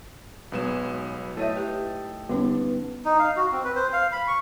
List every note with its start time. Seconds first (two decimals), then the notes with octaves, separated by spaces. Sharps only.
0.52 B1 G#2 F#3 B3 E7
1.37 A2 E4 A4 C#5 D#5 E5 G5
1.56 E4 G4 B4
2.29 G2 D3 B3 C#4 D#4
3.05 D#4
3.19 F5
3.37 F#4
3.52 C4
3.64 B4
3.76 C5
3.93 F5
4.12 B5
4.28 C#6